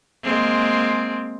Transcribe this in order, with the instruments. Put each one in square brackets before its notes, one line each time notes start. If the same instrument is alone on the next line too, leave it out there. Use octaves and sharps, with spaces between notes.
[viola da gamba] G#3 A#3 C4